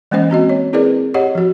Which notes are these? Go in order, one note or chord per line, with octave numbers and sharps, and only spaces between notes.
E3 G#3 A#3 C#4 C5 D#5
A#3 C4 F#4 D#5
C#5
C4 E4 G#4 A#4 B4 D5
G4 C#5 D#5 F#5
F3 F#4